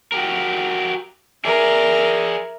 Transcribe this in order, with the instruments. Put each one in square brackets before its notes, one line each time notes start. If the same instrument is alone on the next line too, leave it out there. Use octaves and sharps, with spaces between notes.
[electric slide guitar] F#4 G4 A#4
[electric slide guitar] G#4 D5 [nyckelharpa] A#4 E5